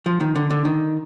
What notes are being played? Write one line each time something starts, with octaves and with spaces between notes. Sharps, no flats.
F3
D#3
D3
D3
D#3